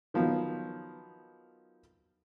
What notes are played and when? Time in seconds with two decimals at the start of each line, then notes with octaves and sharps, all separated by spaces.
0.14 D#3 F3 F#3 B3